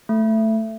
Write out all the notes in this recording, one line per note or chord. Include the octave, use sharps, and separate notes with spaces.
A3